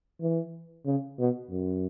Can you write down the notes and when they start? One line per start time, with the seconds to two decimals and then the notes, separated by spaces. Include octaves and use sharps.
0.21 E3
0.86 C#3
1.19 B2
1.51 F#2